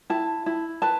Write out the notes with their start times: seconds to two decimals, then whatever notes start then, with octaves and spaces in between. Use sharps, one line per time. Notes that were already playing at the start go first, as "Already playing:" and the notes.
0.10 E4 A5
0.46 E4
0.82 B4 A5